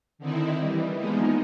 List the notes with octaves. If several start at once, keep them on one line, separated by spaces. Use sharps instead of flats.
D3 D#3 C4 D#4 E4
E3 G3
F3 G#3 A#3 B3 D#4